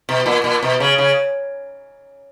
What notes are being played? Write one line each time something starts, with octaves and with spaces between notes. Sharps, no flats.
B2
A#2
A#2
B2
C#3
C#3